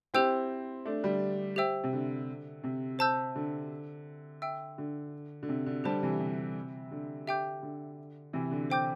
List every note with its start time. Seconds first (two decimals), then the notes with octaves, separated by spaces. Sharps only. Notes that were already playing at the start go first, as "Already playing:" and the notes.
0.14 C4 E4 G4 C5 G5 E6 G6
0.85 A3 D4
1.03 D3 G3
1.56 G4 C5 E5 G5 E6
1.84 C3
1.93 D3
2.64 C3
2.99 C5 A5 E6 G6
3.36 D3
4.42 E5 G5 E6
4.78 D3
5.43 D3
5.49 C3
5.66 D3
5.84 D3 G3 G4 C5 A5
6.02 C3 E3
6.20 C3
6.91 D3
7.27 G4 E5 G5 D6 G6
7.62 D3
8.33 C3 E3
8.51 D3
8.70 C5 G5 D6 G6